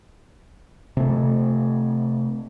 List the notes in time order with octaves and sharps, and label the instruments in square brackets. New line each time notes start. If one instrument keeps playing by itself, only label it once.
[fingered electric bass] C3 A3